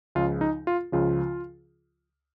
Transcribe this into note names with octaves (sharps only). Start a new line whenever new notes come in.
C#2 C#3 F3 F4
D#4
F4
C#2 C#3 F3 F4